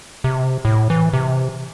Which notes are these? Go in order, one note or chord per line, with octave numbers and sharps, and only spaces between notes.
C3
A2
E3
C3